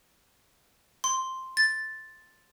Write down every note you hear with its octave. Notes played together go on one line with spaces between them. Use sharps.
C6
A6